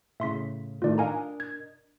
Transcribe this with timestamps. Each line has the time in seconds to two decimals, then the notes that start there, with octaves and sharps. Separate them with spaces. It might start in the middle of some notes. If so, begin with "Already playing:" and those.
0.20 A2 C#3 E5 C6 B6
0.82 A2 D#3 A3 F4 D5
0.98 D4 A#4 D#5 F5 G#5 A#5
1.40 G#6